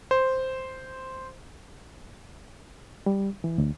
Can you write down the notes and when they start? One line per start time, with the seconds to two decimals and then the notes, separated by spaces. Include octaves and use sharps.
0.11 C5
3.06 G3
3.44 E3
3.58 D2